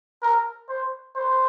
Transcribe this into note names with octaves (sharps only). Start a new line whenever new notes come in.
A#4
C5
C5